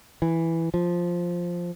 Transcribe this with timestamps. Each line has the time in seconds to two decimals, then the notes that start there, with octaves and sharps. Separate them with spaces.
0.22 E3
0.74 F3